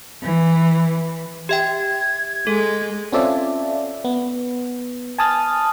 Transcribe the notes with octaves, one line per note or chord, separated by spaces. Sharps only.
E3
G4 E5 G5 G#6
G#3 A4
C4 C#4 F4 A4 D5 E5
B3
G#5 A5 D#6 F6 A6